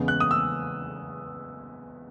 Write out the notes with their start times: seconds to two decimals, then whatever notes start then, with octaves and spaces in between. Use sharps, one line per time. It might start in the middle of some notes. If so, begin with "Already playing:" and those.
Already playing: E2 C#3 G#3 B3
0.08 F#6
0.20 D#6
0.31 E6